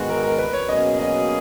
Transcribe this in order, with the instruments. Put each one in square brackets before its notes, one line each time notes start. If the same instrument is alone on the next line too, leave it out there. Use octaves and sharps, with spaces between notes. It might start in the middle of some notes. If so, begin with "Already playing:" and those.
Already playing: [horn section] G#2 D#3 G#3 B3 F#4
[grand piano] A#4
A#4
B4
C#5
[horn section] B2 F#3 A#3 C#4 G#4 [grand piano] D#5
[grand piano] D#5